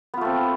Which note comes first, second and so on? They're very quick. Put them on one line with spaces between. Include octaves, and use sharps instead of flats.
B3 F4 A3 C4